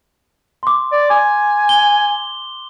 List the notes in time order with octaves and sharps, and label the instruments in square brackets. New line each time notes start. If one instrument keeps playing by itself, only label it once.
[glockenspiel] C6 D6
[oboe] D5
G#5
[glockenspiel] G7